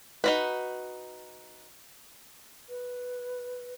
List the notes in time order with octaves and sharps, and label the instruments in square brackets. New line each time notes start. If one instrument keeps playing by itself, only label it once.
[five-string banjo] D#4 F#4 B4
[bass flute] B4